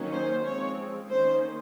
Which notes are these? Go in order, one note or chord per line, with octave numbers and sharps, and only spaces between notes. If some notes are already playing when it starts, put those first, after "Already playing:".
Already playing: D#3 F#3 A#3 C#4
C5
F3 G#3 C4 C#5
D#3 A#3 C#4 C5